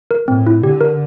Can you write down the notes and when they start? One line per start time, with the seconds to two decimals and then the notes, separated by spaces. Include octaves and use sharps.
0.11 A#4
0.28 A2 C4
0.47 E4
0.63 D3 G4
0.81 A#4